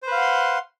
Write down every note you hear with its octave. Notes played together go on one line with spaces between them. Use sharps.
B4 C5 F5 F#5 C6